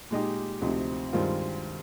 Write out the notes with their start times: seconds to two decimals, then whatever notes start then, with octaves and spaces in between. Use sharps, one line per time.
0.10 A#2 G#3 D#4 G4
0.62 D2 C3 F3 C4 D#4
1.13 G2 D#3 G#3 C4 F4